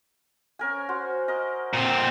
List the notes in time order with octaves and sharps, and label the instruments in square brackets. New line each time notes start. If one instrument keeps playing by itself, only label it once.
[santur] C#4 A#4 G#5
F#4 C5 C6
A#4 D#5
[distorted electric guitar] A#2 C4